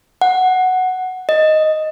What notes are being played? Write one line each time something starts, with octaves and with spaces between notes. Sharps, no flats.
F#5
D#5